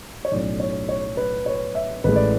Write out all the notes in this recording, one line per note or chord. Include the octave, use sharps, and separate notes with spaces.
C#5
B1 A2 F#3 C#4 D5
C#5
C#5
B4
C#5
E5
A1 A2 G#3 B4
D5